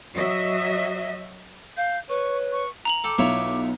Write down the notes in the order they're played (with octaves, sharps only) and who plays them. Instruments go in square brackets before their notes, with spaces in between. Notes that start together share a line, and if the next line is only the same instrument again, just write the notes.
[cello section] F#3 D#5 E5
[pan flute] F5 [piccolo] G6
[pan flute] B4 [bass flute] C#5 [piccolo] C#6
[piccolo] C#6
[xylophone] A#5 F7 F#7
[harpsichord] A4 G5 [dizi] D6
[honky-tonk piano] B1 [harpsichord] E4 F4 C#5